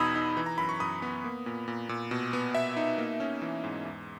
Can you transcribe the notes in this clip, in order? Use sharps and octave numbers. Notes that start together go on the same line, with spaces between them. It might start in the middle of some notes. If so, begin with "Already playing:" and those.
Already playing: E2 B2 D#4 B5 D#6 E6 G#6
D#4
E3
A#5
F#2 B5
C#6
F#2 B5 D#6
B3
A#3
A#2
A#2
A#2
B2
B3
B2 E5
D#4
A#3
C#4
E3
G#2
E2